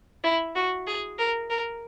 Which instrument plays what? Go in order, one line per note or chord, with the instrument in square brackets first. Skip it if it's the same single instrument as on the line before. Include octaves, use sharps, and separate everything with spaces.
[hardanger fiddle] E4
F#4
G#4
A#4
A#4